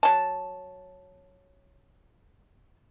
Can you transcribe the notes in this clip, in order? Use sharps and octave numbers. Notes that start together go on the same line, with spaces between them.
F#3 A5